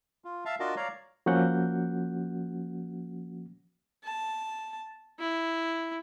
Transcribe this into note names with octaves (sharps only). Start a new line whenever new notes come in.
F4
E5 F5 A5
D4 F4 F#4 A#4 D#5 A5
C#5 D5 F5 A#5
F3 A#3 C#4 F#4 F#5 G6
A5
E4